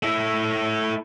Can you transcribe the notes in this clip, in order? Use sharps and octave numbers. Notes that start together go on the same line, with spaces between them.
A3 E4